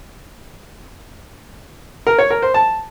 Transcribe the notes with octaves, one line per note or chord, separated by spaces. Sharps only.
A#4
C#5
A#4
C5
A5